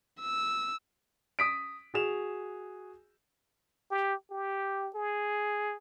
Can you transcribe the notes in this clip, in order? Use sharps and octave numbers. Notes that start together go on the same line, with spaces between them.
E6
D#6 B6 D7
F#4 G#4 E7 F7
G4
G4
G#4